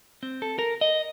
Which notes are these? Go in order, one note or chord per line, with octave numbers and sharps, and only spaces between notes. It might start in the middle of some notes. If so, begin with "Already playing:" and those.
C4
A4
A#4
D#5